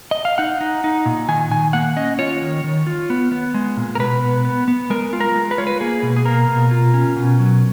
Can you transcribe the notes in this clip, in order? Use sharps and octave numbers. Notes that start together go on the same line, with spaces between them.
D#5
F5
D#4 F#5
D#4
D#4
A#2
D#3 G#5
D#3 G#5
A#3 F#5
C#4 D#5
F4 C#5
D#3
D#3
F4
B3
B3
G#3
A#2
A#4
B2 B4
B3
B3
B3
G#3 A#4
F4
A#4
G#3
B4
F4 C#5
B4
A#3 G#4
B2
G#4
A#3 A#4
B2
F4
C#4
B2
F#3